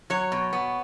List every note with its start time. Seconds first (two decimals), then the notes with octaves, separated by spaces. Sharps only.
0.10 F#3 C#5
0.32 B2
0.53 B3